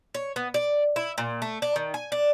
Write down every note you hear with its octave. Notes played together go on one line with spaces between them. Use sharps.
C#5
B3
D5
E4
A#2
A3
D4
D#3
G#5
D4